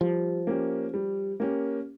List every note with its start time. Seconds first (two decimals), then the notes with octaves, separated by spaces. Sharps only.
0.01 F3 G3
0.47 A#3 C#4 G4
0.94 G3
1.40 A#3 C#4 G4